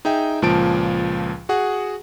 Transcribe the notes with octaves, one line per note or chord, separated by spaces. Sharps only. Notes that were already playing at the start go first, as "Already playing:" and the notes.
D#4 G#4 E5 G5
C#2 A#2 F3 A5 D7
F#4 G#4 F#5